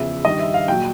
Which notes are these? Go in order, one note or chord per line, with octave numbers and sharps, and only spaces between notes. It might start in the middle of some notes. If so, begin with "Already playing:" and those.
Already playing: E2 C#3 F3 E5
G2 D#3 G3 D#5
E5
F5
A#2 F#3 G5